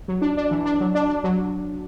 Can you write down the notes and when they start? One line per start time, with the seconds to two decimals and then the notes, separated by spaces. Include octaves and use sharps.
0.08 F#3
0.22 D4
0.37 D4
0.51 E3
0.65 D4
0.81 F#3
0.95 D4
1.09 D4
1.24 F#3